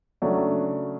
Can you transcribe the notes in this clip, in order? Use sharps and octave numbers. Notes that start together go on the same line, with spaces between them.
C#3 F#3 A3 D4